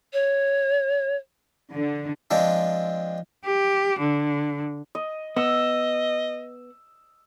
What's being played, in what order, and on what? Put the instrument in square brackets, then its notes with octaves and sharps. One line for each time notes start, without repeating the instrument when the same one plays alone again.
[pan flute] C#5
[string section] D3
[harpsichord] F3 G#3 C4 D4
[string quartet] G4
D3
[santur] D#5
[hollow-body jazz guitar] B3 [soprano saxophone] D#5 [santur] E6